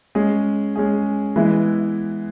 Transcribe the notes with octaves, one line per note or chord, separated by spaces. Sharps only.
G#3 C#4 G#4
G#3 C#4 G#4
E3 G#3 B3 E4 B4